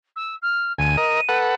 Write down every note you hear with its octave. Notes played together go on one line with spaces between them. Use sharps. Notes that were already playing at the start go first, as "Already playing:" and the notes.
E6
F6
D2 G#5 D#7
A#4 D#5
A4 B4 F#5